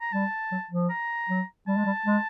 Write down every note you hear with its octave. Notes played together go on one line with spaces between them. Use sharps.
A#5
G3 A5
F#3
F3
A#5
F#3
G3 A5
G#3
G3
G#3